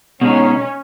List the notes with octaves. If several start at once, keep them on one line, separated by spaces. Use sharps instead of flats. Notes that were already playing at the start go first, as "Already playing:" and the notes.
B2 G#3 C#4 D#4